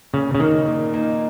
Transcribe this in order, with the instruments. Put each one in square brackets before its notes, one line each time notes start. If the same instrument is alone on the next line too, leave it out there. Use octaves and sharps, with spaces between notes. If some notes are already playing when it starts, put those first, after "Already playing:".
[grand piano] A#2 [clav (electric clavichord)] C#3
[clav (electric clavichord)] C#3
[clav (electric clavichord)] D#3 [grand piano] A#3 D#4
[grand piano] A#2
A#3 D#4